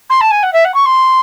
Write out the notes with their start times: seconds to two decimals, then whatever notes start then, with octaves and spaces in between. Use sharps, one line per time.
0.09 C6
0.20 A5
0.30 G#5
0.42 F#5
0.53 E5
0.64 F#5
0.74 C#6
0.85 C6